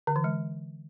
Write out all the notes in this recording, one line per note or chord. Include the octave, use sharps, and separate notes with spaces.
D3
E3
G#3